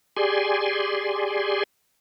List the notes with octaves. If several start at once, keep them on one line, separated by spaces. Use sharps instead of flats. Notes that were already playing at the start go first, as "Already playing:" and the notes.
G4 G#4 D5 G#5 C6